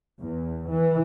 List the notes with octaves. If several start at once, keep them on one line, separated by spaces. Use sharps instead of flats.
E2
E3